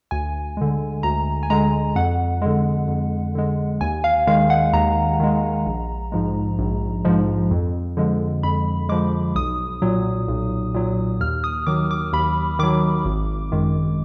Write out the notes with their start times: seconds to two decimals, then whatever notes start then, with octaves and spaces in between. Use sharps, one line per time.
0.11 D2 G#5
0.57 D3 G#3
1.03 D2 A#5
1.43 G#5
1.50 D3 G#3 A#5
1.96 F2 F#5
2.42 D3 G#3
2.88 F2
3.35 D3 G#3
3.81 D#2 G#5
4.04 F5
4.27 D#3 G#3 F5
4.50 F#5
4.73 D#2 A#5
5.20 D#3 G#3
5.66 A#1
6.12 G#2 F3 G#3
6.59 A#1
7.05 G#2 F3 G#3
7.51 F2
7.97 D3 F3 G#3
8.43 F2 B5
8.89 D3 F3 G#3 D6
9.35 B1 D#6
9.82 A#2 F#3
10.28 B1
10.75 A#2 F#3
11.21 D#2 F6
11.44 D#6
11.67 D#3 F#3 D6
11.91 D6
12.13 D#2 B5
12.59 D#3 F#3 D6
13.05 G#1
13.52 F#2 D#3 G#3